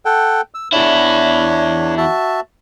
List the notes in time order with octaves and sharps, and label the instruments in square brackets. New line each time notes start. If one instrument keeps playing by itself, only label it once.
[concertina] A4 F#5 G5
E6
[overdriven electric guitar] E2 E4 [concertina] D4 C#5
[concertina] F#4 E5 A5